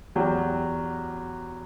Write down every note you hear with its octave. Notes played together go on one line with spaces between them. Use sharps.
E2 F#3 G4